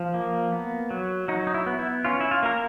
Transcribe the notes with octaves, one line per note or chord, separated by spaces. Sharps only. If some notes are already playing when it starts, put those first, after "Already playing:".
Already playing: F3
A#3
B3
F#3
F#3 D#4
D#4
E4
B3
E4
C#4 F4
E4
F4
A#3 A#4